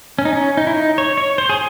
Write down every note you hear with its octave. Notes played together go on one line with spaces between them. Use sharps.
C#4
D#4
C#4
D#4
E4
D#4
C#5
C#5
C5
G#4